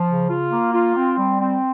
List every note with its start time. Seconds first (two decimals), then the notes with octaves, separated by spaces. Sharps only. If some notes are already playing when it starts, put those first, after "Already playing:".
Already playing: F3
0.08 C#3
0.30 F4
0.51 A#3
0.73 F4
0.96 C4
1.18 G3
1.39 C4